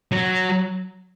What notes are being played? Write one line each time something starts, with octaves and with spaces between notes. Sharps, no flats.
F#3